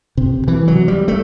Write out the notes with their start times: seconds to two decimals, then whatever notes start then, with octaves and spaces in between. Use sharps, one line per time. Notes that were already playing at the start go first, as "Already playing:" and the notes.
0.17 C3
0.48 E3
0.68 F#3
0.88 G3
1.08 A3